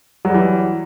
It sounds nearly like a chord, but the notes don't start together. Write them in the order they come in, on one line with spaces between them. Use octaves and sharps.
F#3 G3 E3